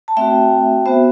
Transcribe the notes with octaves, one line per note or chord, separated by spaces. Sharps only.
A5
A3 C4 F#4 E5 G5
B3 F#4 C5 E5